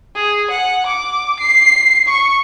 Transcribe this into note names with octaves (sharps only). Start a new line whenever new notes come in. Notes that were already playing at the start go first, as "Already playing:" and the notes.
G#4
F#5
D6
C7
C#6